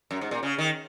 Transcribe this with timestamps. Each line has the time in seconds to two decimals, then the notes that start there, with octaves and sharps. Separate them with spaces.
0.11 F#2
0.21 G#2
0.31 A#2
0.43 C#3
0.58 D#3